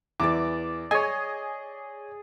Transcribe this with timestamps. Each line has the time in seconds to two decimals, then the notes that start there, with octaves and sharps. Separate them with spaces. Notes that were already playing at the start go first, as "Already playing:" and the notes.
0.20 E2 E3 D5 D6
0.91 G#4 C#5 D#5 G#5